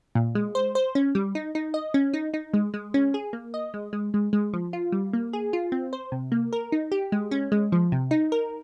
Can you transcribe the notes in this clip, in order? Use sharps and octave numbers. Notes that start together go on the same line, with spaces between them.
A#2
G#3
C5
C5
C#4
G3
D#4
D#4
D#5
C#4
D#4
D#4
G#3
G#3
C#4
G#4
A#3
D#5
G#3
G#3
G#3
G#3
F3
F4
G3
A#3
G#4
F4
C4
C5
C3
A#3
A#4
D#4
G4
G#3
C#4
G#3
F3
C3
D#4
A#4